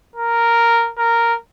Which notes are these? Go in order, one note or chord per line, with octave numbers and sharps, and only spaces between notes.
A#4
A#4